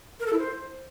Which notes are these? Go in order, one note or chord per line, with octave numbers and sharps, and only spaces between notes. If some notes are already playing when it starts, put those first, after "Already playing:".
A#4
A4
E4
C5